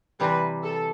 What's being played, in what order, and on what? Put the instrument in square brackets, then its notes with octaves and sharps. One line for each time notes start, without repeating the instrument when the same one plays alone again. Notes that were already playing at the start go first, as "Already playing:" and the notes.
[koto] C3 E3 G3 [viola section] B4
[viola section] A4